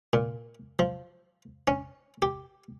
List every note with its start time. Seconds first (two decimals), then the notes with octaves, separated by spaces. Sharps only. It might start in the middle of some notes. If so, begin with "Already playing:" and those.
0.13 A#2
0.79 F3
1.68 C#4
2.22 G4